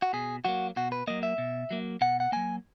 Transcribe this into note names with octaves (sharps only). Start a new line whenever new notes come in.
F#4
B2 G#4
F#3 A#3 F#4
B2 F#4
B4
F#3 A#3 D#5
E5
B2
F#3 A#3
B2 F#5
F#5
F#3 A#3 G#5